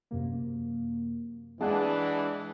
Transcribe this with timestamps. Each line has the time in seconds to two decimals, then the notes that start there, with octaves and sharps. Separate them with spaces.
0.11 F#2 C3 A#3
1.61 E3 G#3 D4 F#5 A5